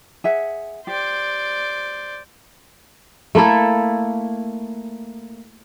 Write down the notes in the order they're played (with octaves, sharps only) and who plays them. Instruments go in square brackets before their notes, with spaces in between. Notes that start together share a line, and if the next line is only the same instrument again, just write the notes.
[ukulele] G#4 E5 F#5
[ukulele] G4 [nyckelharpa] C5 D5
[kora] A3 A#3 E4 A4